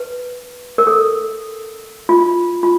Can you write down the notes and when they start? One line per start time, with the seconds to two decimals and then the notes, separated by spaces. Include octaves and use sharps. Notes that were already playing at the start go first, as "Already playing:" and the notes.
Already playing: B4
0.78 A#4
0.87 A4
2.09 F4
2.63 F4